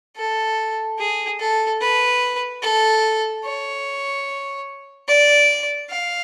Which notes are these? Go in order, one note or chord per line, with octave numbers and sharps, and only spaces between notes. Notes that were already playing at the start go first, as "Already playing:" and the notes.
A4
G#4
A4
B4
A4
C#5
D5
F5